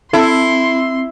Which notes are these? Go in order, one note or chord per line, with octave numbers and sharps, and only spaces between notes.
C4 E4 A4 C6